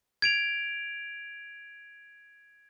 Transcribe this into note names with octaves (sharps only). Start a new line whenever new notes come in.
G#6 D7 F7